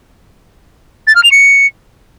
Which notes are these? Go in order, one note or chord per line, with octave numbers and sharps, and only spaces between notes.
A6
F6
F7
C#7